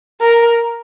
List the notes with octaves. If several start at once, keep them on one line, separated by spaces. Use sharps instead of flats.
A#4